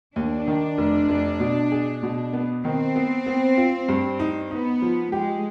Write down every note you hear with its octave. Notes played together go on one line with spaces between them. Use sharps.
D#2 D4
D#3
F1
F1
B2
G#4
B2
B3
D#3 C4
B3
B3
F4
G2
D#4
B3 D#4
F3
G#3 G4